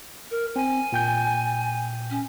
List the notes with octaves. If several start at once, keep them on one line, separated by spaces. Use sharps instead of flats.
A#4
C4 G#5
A#2 G5 G6
C#4